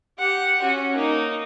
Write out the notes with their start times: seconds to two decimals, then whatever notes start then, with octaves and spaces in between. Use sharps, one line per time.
0.18 G4 F#5
0.62 C#4 F#4
0.95 A#3 D#4